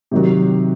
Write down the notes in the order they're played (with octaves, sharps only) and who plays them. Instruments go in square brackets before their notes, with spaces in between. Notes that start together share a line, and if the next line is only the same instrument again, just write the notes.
[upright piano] C3 D#3 F#3